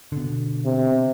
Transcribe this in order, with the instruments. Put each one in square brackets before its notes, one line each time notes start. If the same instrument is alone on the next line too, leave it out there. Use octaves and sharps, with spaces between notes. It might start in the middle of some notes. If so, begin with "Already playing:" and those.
[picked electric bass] B2 D3
[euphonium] C3